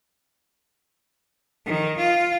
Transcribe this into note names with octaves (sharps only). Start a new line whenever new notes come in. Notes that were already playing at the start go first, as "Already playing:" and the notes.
D#3
F4